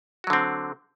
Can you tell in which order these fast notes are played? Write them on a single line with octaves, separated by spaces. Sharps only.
F#4 F#3 D3 C4